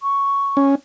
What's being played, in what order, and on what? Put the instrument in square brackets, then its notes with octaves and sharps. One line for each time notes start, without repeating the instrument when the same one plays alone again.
[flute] C#6
[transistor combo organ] C#4